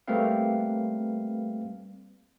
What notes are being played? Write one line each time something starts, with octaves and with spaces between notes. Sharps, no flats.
G3 A3 A#3 C4 B4 F5